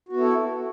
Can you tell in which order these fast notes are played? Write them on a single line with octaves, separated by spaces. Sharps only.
F#4 B3 E4 A4